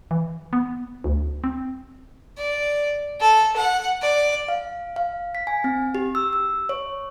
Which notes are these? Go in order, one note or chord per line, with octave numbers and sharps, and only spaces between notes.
E3
B3
D2
C4
D5
A4
F#5
D5
F5
F5
B6
G#5
C4
G4
E6
E6
C#5